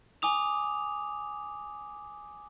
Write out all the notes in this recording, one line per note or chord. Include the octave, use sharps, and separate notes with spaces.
G#5 D6 D#6 F7